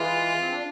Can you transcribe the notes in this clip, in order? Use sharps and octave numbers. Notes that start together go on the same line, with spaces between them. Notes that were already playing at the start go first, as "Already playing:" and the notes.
Already playing: E3 G#3 F4
C4
D4